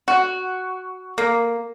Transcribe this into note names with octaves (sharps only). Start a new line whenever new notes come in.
F#4
A#3